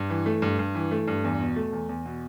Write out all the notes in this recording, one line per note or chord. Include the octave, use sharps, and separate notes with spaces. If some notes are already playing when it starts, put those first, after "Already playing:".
Already playing: G2
E3
A3
G2
G2
E3
A3
G2
E2
B2
A3
E2
E2
B2